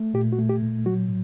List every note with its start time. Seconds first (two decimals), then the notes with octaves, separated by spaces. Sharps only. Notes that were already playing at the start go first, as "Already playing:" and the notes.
Already playing: A3
0.14 A#2 G4
0.33 F#4
0.38 A3
0.50 G4
0.62 A#2
0.86 F#3 F#4
1.08 A2